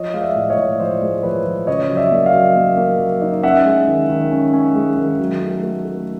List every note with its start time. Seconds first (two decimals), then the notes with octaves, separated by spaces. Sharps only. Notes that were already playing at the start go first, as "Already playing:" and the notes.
Already playing: F3 C#5 D#5
0.13 G#3 F5
0.21 D5 E5
0.36 A2
0.50 C#5 D#5
0.58 A2
0.79 F3 C5 D5
1.02 G#3
1.23 F3 B4 C#5
1.45 F3
1.67 C#3 C#5 D#5
1.90 F#3
1.97 D5 E5
2.12 A#3
2.26 D#5 F5
2.34 F#3
2.56 A#3
2.77 A#3
3.00 F#3
3.22 D#4
3.43 C#4 E5 F#5
3.66 G#3
3.88 D#3
4.09 D#3
4.32 C#4
4.53 C#4
4.75 G#3
4.97 D#3
5.19 F#3
5.41 A3
5.63 A3
5.85 A3